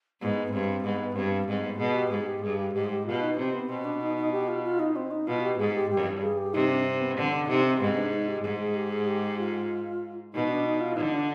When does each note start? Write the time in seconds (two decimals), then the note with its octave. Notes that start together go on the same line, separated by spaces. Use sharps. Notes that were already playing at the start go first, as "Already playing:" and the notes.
0.21 G#2 B3
0.47 B3
0.53 G2 C4
0.84 G#2 B3
1.16 G2 C4
1.47 G#2 C4
1.63 B3
1.78 B2 G#4
1.95 G4
2.11 G#2 G#4
2.26 G4
2.42 G2 G#4
2.58 G4
2.74 G#2 G4
2.84 G#4
2.90 G4
3.06 B2 F4
3.21 D#4
3.37 C3 C4
3.53 B3
3.69 B2 C4
3.84 D4
4.01 D#4
4.17 D#4
4.32 G4
4.48 F4
4.63 F4
4.79 D#4
4.96 C4
5.11 D#4
5.27 B2 F4
5.43 G4
5.59 G#2 G#4
5.75 G4
5.90 G2 G4
6.22 G#4
6.38 G4
6.54 C3 D#4
6.69 D4
6.85 C4
7.01 B3
7.17 D3 C4
7.32 D4
7.48 C3 D#4
7.64 C4
7.80 G#2 B3
7.96 D4
8.11 D#4
8.28 G4
8.43 G#2 G#4
8.59 G#4
8.75 G4
8.91 G#4
9.07 G4
9.39 F4
10.33 B2 D#4
10.49 D4
10.65 D#4
10.81 F4
10.96 D3 D#4
11.13 D4